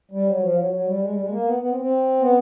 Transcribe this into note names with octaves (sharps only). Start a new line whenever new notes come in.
G3
F#3
F3
F#3
F#3
G3
G#3
G3
G#3
A#3
B3
B3
C4
C4
B3